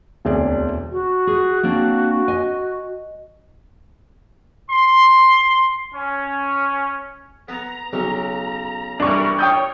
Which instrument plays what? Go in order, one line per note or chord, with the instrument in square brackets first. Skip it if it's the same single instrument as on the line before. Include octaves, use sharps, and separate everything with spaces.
[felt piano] E1 D2 C4 G#4 D5
[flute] F#4
[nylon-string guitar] G#4
A#3 C4 D4
D#5 G#5
[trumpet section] C6
C#4
[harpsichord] B3 [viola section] A#5
[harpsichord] B1 C#3
[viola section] E3 G3 A#4 [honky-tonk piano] D4 C#6
[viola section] C#5 [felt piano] G5 D#6 G6